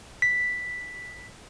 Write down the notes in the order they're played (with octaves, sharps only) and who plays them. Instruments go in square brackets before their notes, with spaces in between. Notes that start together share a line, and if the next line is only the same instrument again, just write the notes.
[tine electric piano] B6